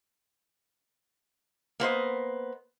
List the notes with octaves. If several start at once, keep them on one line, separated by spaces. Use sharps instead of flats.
A#3 B3 C5 D#5